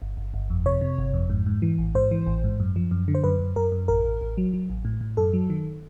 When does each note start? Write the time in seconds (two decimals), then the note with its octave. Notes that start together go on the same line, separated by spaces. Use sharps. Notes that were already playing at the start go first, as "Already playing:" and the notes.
0.02 G1
0.17 G1
0.34 G1
0.50 F2
0.66 C3 C#5
0.81 C3
0.98 G1
1.14 F2
1.30 G#2
1.46 G#2
1.62 E3
1.79 A1
1.95 G#2 C5
2.11 E3
2.27 A1
2.44 G#2
2.60 F#2
2.76 F3
2.91 F#2
3.08 D3
3.15 C5
3.24 F#2 B4
3.40 F#2
3.56 F#2 A#4
3.72 F#2
3.88 A1 A#4
4.04 A1
4.21 A1
4.37 F#3
4.53 F#3
4.70 A1
4.85 A2
5.01 A2
5.17 F#2 A4
5.33 F#3
5.50 D#3